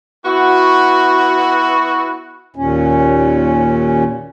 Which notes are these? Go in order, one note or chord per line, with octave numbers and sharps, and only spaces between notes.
B3 E4 F#4
D#2 A#2 C#4